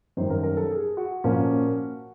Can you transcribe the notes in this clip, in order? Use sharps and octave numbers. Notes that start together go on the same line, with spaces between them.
F#2 D#3 G3 C5
A#4
A#4
A4
G#4
F#4
A#2 F3 A#3 C#4